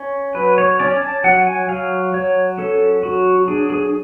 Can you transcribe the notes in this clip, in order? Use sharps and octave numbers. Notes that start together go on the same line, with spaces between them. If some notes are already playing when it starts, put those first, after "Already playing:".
Already playing: C#4
F#3 B4
C#5
C#4 D5
A5
F#3 F#5
G#5
F#3 F5
F#3 C#5
C#4 A4
F#3 F#4
D4 G#4
G#4